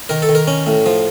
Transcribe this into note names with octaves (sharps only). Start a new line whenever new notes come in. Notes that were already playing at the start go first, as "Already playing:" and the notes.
D#3 A#4
A4
D#3
A#4
C#4
A2
F3